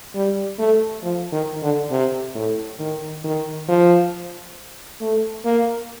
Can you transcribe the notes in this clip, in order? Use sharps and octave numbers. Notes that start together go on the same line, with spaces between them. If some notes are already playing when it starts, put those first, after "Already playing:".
G3
A3
F3
D#3
D3
C3
A2
D#3
D#3
F3
A3
A#3